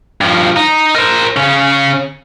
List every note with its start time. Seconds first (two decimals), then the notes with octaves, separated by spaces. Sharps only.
0.21 G2 F3
0.56 D#4
0.96 A#4 C5
1.36 C#3 C#4